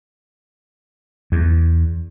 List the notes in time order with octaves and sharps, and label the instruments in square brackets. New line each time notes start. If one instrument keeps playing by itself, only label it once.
[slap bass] E2